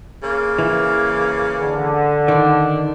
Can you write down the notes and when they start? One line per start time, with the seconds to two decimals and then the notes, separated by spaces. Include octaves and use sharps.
0.23 C#3 A#3
0.58 E3
1.60 D3
2.28 D#3 D4